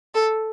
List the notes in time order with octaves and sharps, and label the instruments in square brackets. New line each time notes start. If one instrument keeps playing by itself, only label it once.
[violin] A4